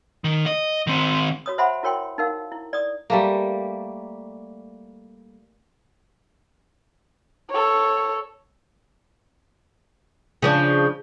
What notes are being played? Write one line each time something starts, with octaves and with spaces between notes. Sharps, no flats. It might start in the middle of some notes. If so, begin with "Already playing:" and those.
D#3
D#5
D#3 C4
F#4 C#5 D#6
C5 E5 F#5 G#5 B5 C6
E4 F#4 A#4 C#5 G5 C6
D#4 A#4 F5
E4
D5 D#6
G3 A3 A#3
A4 C#5
C#3 F3 D4